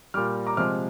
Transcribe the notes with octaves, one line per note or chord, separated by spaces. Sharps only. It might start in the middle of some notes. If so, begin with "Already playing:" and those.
A#2 G3 D6 F6
A#5 D6
C3 F3 G#3 D6 F6